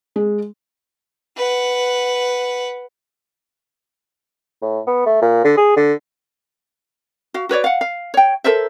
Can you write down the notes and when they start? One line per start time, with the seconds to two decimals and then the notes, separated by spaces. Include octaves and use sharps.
0.16 G#3
1.37 B4 F#5
4.62 A2
4.87 B3
5.06 A3
5.22 A#2
5.45 D3
5.57 G#4
5.77 D3
7.34 F#4 F5
7.49 F#4 B4 C#5 D5
7.64 F5 F#5
7.81 F5
8.14 C#5 G5
8.44 A4 A#4 C5 E5